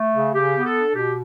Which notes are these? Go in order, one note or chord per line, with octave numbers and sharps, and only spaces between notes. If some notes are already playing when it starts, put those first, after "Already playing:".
Already playing: A3
C#3
C#3 G4
B3
A4
D4
B2 G4